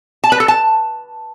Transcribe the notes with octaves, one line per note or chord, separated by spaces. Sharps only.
A5
B4
A4
A5